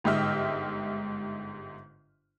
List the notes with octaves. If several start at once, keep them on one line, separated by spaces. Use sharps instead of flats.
G1 G#2 G4 D#5 E5 F6